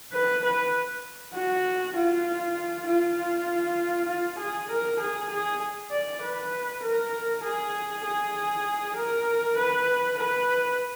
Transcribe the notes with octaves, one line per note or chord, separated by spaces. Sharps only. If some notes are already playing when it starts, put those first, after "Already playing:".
B4
B4
F#4
F4
F4
F4
G#4
A#4
G#4
G#4
D5
B4
A#4
G#4
G#4
A#4
B4
B4